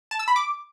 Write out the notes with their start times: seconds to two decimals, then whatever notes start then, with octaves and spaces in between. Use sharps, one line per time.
0.11 A5
0.19 E6
0.28 B5
0.36 D6